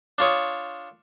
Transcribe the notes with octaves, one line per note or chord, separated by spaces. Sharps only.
D4 F4 C#5 D#6